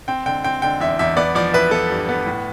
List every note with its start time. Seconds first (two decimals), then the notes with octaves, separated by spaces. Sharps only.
0.08 C4 G5
0.26 D3 G5
0.44 C4 G5
0.62 D3 G5
0.80 E2 E5
0.99 E2 E5
1.17 B3 D5
1.35 F3 D5
1.53 E4 B4
1.71 B3 A4
1.90 G2
2.09 B3
2.26 A2